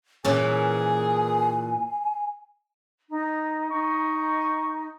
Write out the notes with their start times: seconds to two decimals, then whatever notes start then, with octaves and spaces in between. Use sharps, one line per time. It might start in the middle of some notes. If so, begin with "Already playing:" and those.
0.25 A#2 E3 C#4 G#4 G#5
3.09 D#4
3.71 D#4 C#6